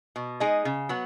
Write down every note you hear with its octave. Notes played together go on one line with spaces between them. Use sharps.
B2
G#3 D#4 G#4 D#5
C#3
F#3 B3